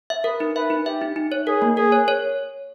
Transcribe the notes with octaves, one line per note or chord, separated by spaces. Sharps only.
E5
A#4 B4
D#4
B4 E5
D#4
G4 E5
D#4
D#4
C#5
G#4 A#4
A#3
G#4 A#4
C#5
C#5